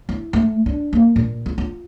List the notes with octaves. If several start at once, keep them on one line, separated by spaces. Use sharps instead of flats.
E4
A3
D4
A#3
A#2
F4
F4